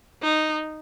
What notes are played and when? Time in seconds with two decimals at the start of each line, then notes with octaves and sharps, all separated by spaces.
0.23 D#4